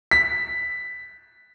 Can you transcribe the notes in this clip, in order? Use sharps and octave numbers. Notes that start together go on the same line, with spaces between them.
B6